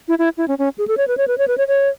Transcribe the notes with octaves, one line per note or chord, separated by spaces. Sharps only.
E4
E4
E4
C#4
C#4
G#4
A4
C#5
B4
C#5
B4
C#5
B4
C#5
C#5